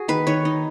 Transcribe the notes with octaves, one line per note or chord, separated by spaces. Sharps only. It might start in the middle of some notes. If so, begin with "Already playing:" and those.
Already playing: F#4 G#4
D#3 B4
D#3 C#5
D#4